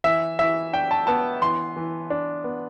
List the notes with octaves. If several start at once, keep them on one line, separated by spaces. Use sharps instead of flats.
E3 E5
E3 E5
D4 G5
A5
B3 A5
E3 C6
E3
D4
B3